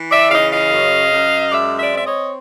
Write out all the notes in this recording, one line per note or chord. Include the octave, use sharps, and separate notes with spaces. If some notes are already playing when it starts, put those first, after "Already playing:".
Already playing: E3
D5 E5
C#3 D#5 F5
D#5 F5
F#2
F#2
G#3 D5 E5
D5 E5
C4 E5
C#5 D#5